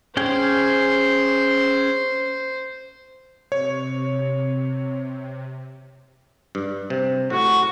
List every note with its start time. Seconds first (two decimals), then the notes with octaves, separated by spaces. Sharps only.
0.17 C#4 G#4 C5 G5
3.52 C3 C#5
6.55 G2
6.90 C3
7.30 A2 F#4 C#6